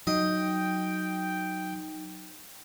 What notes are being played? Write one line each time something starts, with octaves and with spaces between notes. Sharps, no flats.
F#3 D#4 D#5 G5